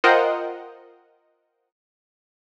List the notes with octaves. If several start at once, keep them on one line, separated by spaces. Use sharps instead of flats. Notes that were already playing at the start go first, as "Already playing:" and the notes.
F4 A#4 C5 D#5 F#5 G5